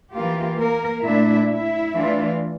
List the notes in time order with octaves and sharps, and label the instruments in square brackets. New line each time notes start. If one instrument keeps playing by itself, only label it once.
[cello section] E3 A#3 F4 G4
A#3 A#4
A#2 A3 D4 E4 E5
E4 E5
E3 A3 D4 F4